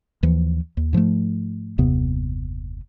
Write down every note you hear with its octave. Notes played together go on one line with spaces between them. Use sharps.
D#2 E3 F3
D#2
G#2 F3 F#3 A3
F#1 D#2 C3 B3